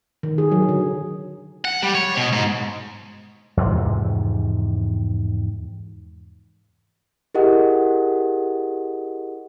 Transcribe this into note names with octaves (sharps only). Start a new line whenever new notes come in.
D#3
G#4
F#3
D3
F#5
G3
C#5
B2
G#2
E2 G#2 C3 F3
E4 G4 G#4 A#4 D#5 F#5